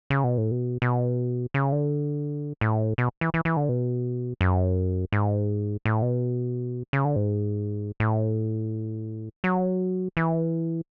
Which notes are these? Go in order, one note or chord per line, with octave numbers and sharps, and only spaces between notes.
C#3
B2
A2
B2
B2
C#3
D3
A2
B2
E3
E3
E3
D3
B2
F#2
G#2
A2
B2
C#3
D3
G#2
A2
F#3
E3